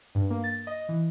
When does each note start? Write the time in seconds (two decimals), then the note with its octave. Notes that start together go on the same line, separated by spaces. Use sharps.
0.15 G2
0.30 A#3
0.44 A6
0.67 D#5
0.89 E3